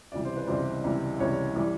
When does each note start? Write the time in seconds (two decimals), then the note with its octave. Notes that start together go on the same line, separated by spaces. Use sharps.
0.12 C#2 C3 E3 G3 D5
0.25 C5
0.36 B4
0.48 C#2 C3 E3 G3 C5
0.84 C#2 C3 E3 G3
1.19 C#2 C3 E3 G3 C#5
1.56 E3 G3